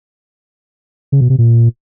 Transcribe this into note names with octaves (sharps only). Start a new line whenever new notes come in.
C#3
B2
C3
A#2